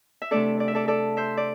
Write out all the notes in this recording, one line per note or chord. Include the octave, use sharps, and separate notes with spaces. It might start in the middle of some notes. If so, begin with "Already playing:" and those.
E5
C3 A3 D4 A4 D5
D5
E5
A4 D5
A4 D5
C5 E5
D5